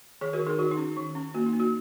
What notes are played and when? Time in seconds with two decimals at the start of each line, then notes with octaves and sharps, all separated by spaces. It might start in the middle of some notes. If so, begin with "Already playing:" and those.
0.21 D#3 G#4 C#5
0.33 F#4 A#4
0.39 D#3
0.47 D#4 G#4
0.59 D#3 F#4
0.71 D#4
0.77 C#4
0.96 D#3
1.15 C#4
1.34 A#3 F#4
1.46 D#4
1.53 A#3
1.60 F#4